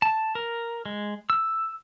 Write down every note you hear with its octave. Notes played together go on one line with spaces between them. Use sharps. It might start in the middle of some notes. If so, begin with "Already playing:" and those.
A5
A#4
G#3
E6